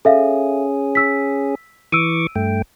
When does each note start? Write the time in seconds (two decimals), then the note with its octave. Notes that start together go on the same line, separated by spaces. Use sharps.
0.05 C#4 G#4 A4 E5 F5
0.95 E6 B6
1.92 E3 C#6 D6 E6 D7 D#7
2.36 G2 A3 G5